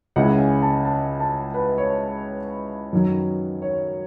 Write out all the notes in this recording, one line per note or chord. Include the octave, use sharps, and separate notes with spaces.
C#2 C#3 G#3 C#4 E4 F#5
G#5
A5
A5
A5
B4
C#5
F#2 D#3 F#3
C#5